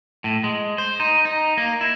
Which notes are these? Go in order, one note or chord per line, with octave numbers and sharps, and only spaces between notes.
A2
G#3
C5
D#4
D#4
A#3
E4